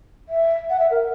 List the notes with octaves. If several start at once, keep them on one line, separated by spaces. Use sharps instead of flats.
E5
F#5
E5
A#4